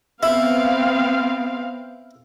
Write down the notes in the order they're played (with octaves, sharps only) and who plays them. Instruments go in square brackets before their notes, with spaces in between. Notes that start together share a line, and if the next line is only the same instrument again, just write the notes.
[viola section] B3 C4 F5 [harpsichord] E4